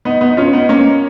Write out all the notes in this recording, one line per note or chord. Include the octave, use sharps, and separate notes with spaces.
B3 D#4
B3 D#4
D#4
C#4 F4
B3 D#4
A#3 C#4